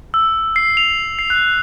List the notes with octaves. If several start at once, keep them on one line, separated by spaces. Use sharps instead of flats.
E6
C7
F7
C7
F#6